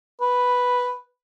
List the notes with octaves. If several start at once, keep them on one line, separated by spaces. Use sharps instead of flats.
B4